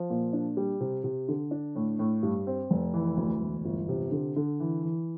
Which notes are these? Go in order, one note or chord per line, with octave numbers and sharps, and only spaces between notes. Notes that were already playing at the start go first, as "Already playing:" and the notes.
Already playing: F3
A#2
D4
G3
C3
C3
D3
D4
A2
A2
G2
C4
F1
E3
D2
E1
G1
C3
D3
D3
E3
E3